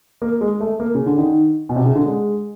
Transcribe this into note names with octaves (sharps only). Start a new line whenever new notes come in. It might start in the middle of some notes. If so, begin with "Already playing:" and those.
A#3
G#3
A3
A#3
C#3
D3
D#3
B2
C3
C#3
D3
G#3